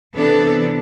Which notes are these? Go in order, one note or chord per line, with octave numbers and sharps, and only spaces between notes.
C3 E3 B3 D4 A4